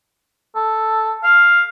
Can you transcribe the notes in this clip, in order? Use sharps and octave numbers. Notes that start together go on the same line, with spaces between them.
A4
F5